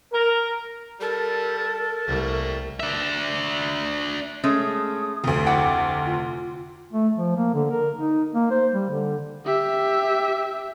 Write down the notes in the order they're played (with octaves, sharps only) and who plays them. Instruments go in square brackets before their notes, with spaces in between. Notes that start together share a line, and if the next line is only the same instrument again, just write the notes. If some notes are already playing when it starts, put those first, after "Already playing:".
[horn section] A#4
[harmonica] G3 [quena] A4 [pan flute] A#4
[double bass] C2 [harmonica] G3 A3 A#3
[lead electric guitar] D4 E5
[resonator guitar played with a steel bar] G#3 A3 C#4 [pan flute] D#6
[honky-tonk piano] F1 D2
[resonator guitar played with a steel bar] E4 F#5 G5 [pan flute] D6
[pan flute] F4
[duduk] A3
F3
A#3
D3
A#4
D#4
A#3
C5
G3
D3
[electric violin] G4 E5